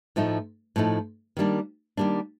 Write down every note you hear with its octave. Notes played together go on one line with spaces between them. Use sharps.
A2 F3 A3 D#4
A2 F3 A3 D#4
D#3 G3 A#3 D4
D#3 G3 A#3 D4